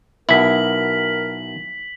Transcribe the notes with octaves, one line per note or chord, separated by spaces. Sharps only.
B1 B3 E4 A#4 B6 F#7